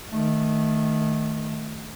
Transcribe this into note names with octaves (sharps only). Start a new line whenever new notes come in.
D#3 A3